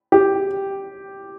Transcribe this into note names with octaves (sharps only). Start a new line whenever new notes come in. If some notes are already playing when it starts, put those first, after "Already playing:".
G4